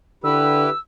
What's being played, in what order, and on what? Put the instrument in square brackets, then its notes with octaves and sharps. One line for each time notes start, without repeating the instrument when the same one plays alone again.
[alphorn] D3 [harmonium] E4 G4 B4 [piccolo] E6